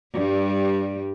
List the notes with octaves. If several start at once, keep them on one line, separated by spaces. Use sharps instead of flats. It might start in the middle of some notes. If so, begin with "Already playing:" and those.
G2 G3